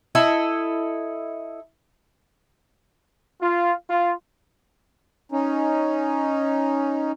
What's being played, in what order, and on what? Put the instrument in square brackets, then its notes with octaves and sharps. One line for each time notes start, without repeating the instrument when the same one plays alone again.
[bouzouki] E4 A4 D#5
[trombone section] F4
F4
[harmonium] C#4 D#4